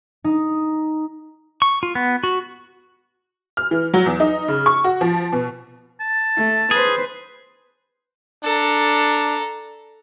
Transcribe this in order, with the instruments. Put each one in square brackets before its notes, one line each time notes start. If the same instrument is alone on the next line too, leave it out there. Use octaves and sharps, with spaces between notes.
[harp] D#4
[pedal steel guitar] C#6
F4
B3
F#4
[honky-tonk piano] F6
E3
F#3
E2
D#4
C#3
C#6
F#4
F3
B2
[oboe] A5
[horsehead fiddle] A3
[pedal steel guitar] G#4 [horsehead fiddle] B4 C5
[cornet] D4 [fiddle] A4 A#5